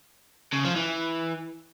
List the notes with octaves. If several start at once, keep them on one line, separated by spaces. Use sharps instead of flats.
C#3
F3
E3